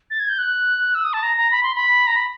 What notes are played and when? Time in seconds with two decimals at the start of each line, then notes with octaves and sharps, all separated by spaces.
0.10 A6
0.20 G#6
0.29 G6
0.38 F#6
0.95 E6
1.04 D#6
1.13 A5
1.23 A#5
1.37 A#5
1.51 B5
1.63 C6
1.75 B5
2.07 A#5
2.16 B5